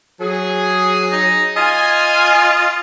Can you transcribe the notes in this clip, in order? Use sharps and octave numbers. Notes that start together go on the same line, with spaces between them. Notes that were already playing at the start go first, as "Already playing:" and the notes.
F#3 G#4
D#4
F4 D#5 G#5